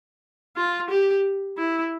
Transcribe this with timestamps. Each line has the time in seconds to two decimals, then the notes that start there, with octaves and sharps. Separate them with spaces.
0.56 F4
0.90 G4
1.57 E4